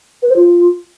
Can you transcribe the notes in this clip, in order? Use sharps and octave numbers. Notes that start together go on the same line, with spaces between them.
B4
C5
F4